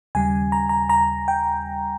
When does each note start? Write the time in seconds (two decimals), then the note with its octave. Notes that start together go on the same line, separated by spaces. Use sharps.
0.15 D#2 C#3 G3 G#5
0.52 A#5
0.69 A#5
0.89 A#5
1.28 G5